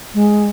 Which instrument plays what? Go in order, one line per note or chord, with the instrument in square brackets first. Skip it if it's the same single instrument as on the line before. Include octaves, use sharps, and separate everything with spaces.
[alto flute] G#3